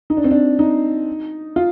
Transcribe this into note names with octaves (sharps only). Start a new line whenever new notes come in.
D#4
D4
C4
D4
D#4
F4